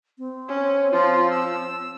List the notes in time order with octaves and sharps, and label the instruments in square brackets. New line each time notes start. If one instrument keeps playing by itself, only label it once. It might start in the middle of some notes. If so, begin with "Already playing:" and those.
[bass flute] C4
[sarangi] C#4
[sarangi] F3 [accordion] F4
[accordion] E6